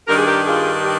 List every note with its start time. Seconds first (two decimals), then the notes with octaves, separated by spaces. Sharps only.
0.07 G2 D#3 G3 D4 A#4
0.17 G#4
0.26 G4 A#4
0.46 F4 G#4
0.84 G4